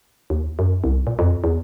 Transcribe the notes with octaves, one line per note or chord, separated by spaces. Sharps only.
D#2
F#2
C2
A#2
F2
E2